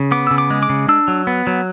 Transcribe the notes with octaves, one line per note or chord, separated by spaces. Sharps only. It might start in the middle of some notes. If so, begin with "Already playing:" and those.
Already playing: C#3
B3 D6
C#3 E6
D6
G#3
D6
C#3
D4 E6
F#3
B3
F#3